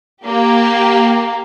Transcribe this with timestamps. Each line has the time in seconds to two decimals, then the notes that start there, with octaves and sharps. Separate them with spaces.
0.24 A#3 G4